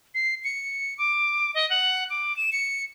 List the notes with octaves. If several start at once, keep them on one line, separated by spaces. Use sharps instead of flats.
C7
C#7
D6
D#5
F#5
D6
E7
C#7